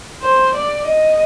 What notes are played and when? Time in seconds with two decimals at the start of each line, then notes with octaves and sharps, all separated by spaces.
0.22 C5
0.55 D5
0.88 D#5